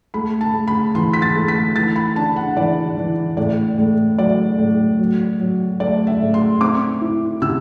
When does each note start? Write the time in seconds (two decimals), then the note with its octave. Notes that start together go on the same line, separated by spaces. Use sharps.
0.14 A3 B5
0.41 A5
0.54 A3
0.68 B5
0.95 E3 C6
1.13 B6
1.22 A6
1.35 A3
1.48 B6
1.76 E3 A6
1.96 B5
2.16 D4 A5
2.36 F#5
2.57 E3 D5
2.97 E3
3.37 A2 D5
3.78 A2
4.18 F#3 D5
4.59 A2
4.99 F#3
5.40 F#3
5.80 A3 D5
6.07 E5
6.20 A2
6.34 C6
6.61 C4 D6
7.01 E4
7.42 C3 E6